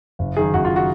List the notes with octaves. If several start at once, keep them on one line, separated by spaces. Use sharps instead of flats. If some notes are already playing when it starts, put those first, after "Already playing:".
F#1
F#2 D#3 G#4
F#1 F#4
F4
D#3
F#4